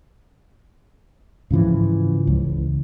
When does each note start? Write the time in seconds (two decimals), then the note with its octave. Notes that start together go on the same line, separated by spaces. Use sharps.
1.51 G#2 C#3 E3 F3
2.27 C#2